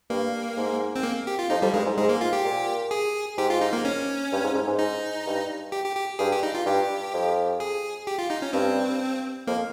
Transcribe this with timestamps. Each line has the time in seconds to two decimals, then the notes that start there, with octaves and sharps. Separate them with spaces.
0.10 G2 A#3
0.57 G#2
0.96 C4
1.03 A#3
1.27 G4
1.39 F4
1.50 F2 D#4
1.62 F2 G3
1.74 G2 G#3
1.85 G#2
1.97 G#2 G#3
2.09 A#3
2.21 F4
2.33 G4
2.44 A#2
2.91 G#4
3.38 G#2 G4
3.50 F4
3.61 D#4
3.73 A#3
3.85 C#4
4.32 G2
4.44 G#2
4.55 G#2
4.67 G#2
4.79 D#4
5.26 G2
5.72 G4
5.84 G4
5.96 G4
6.19 G2 G#4
6.32 G4
6.43 D#4
6.55 F4
6.66 G2 G4
7.14 F2
7.60 G#4
8.07 G4
8.18 F4
8.30 D#4
8.42 C#4
8.53 G2 C4
9.47 F2 A#3